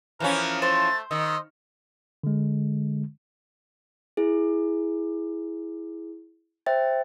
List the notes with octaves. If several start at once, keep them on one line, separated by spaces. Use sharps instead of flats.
E3 F3 C#4 A#4
A3 C5 A6
D#3 D#5 E6
D3 G#3
E4 G#4
C5 E5 G5 A6